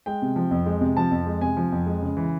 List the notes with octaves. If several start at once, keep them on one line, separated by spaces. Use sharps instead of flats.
G#3 G5
C3
F3
F2
G#3
C3
F3 A5
F2
G#3
C3 G#5
F3
F2
G#3
C#3
E3